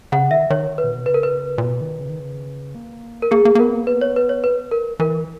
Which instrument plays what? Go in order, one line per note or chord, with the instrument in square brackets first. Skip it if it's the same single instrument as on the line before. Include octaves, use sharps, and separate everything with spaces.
[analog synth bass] C#3 [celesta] F#5
[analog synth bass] D#3 [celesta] E5
[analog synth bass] D#3 [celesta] C#5
[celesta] B4
[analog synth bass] A#2
B2
[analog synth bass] C#3 [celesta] B4
[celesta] A#4
B4
[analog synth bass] A#2
B2
D#3
C#3
D#3
C#3
A#3
[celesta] A#4
[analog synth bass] A#3 [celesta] G#4
[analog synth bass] A#3
A#3
[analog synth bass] B3 [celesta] A#4
[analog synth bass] A#3
[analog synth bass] B3 [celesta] B4
[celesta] C#5
B4
C#5
B4
A#4
[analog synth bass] E3 [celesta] A#4